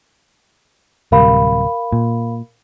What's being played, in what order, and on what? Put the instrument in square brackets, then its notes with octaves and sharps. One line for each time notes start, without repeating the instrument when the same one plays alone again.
[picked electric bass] D1 C3 G3 [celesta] A#4 F5 B5
[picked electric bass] A#2